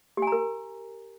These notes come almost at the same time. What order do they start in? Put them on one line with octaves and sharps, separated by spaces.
G4 G#5 A#5 A#4